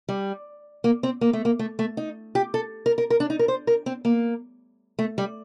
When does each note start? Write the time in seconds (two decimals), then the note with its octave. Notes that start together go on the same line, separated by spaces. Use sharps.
0.09 G3
0.84 A#3
1.03 C4
1.21 A#3
1.33 A3
1.45 A#3
1.59 A3
1.79 A3
1.97 D#4
2.35 G4
2.54 A4
2.86 A#4
2.98 A#4
3.10 A#4
3.20 D4
3.30 D#4
3.39 A#4
3.48 C5
3.67 A#4
3.86 C4
4.05 A#3
4.99 A3
5.18 G3